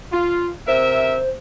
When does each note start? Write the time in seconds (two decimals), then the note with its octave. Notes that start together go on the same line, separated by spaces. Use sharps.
0.13 F4
0.68 C3 A#4 C5 E5